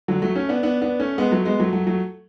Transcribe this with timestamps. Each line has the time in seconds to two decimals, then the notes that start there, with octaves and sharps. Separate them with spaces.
0.08 D3 F#3
0.22 F#3 A3
0.36 A3 C#4
0.49 B3 D4
0.63 B3 D4
0.82 B3 D4
1.00 A3 C#4
1.18 G#3 B3
1.31 F#3 A3
1.45 G#3 B3
1.60 F#3 A3
1.73 F#3 A3
1.87 F#3 A3